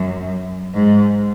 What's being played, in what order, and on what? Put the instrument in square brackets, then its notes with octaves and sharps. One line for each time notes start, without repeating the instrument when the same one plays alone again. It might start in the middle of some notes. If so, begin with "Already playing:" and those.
Already playing: [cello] F#2
G#2